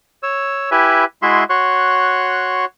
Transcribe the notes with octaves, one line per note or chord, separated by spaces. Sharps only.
C#5 E6
E4 G4 B4 E5 G#5
G#3 E4 F#4 G#4 E5 C6
F#4 C#5 C6 C#6 F#6